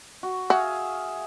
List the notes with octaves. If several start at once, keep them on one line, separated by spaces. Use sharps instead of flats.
F#4
F#4 G#4 E5 F5